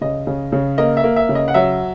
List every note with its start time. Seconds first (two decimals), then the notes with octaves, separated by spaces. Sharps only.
0.01 C#3 D#5
0.27 C#3
0.52 C#3
0.78 A#3 D#5
0.97 E5
1.04 A#3
1.16 E5
1.29 C#3
1.35 D#5
1.48 F#5
1.54 F#3 E5